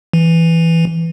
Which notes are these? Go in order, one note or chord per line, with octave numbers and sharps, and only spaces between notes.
E3